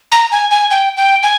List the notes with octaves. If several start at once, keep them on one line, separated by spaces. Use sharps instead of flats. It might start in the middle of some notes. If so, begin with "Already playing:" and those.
A#5
G#5
G#5
G5
G5
G#5